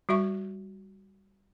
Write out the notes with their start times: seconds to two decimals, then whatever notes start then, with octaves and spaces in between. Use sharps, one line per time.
0.09 G3 F#4 E5 C#6